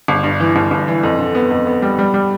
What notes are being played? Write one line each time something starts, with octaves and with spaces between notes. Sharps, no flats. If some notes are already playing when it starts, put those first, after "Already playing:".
G1
G2
E3
G1
G1
E3
F2
D3
B3
F2
B3
G3
G3
G3